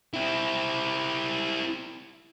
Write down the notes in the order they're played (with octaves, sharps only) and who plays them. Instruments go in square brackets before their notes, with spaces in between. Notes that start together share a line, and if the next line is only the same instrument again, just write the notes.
[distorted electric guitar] C4 E4